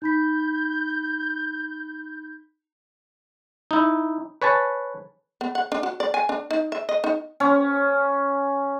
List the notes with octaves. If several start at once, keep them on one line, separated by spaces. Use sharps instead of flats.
D#4 B5 G6 B6
D#4 E4
B4 C#5 G#5 A5
B3
F#5
D4
F#4
D5
G#5
D4
D#4
E5
D#5
D#4
C#4